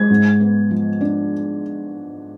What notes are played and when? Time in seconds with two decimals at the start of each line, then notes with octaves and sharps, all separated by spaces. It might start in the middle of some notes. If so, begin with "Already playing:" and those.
Already playing: G#3 G#6
0.10 G#2
0.40 B3
0.71 F3
1.01 D4